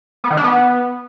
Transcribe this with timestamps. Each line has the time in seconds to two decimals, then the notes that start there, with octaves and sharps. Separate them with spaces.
0.24 B3
0.31 D#3
0.37 D4
0.44 B3